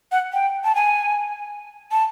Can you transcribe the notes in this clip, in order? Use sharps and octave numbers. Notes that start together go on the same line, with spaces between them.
F#5
G5
A5
G#5
A5